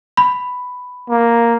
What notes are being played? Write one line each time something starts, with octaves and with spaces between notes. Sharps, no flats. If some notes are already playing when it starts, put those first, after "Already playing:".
B5
A#3